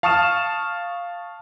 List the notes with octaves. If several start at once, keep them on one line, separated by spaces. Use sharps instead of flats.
F5 A5 C#6 D#6 F6 E7